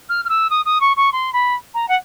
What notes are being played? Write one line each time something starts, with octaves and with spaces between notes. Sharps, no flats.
F6
F6
E6
D#6
D#6
C#6
C#6
C6
B5
A#5
F#5